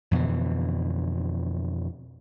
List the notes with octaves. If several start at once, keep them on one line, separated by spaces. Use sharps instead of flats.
F2 B2 D3 E3